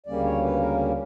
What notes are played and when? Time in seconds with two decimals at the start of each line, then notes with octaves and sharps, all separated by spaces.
0.06 D2 C#3 G3 A#3 C#4 D5
0.25 C#5
0.43 B4
0.60 A#4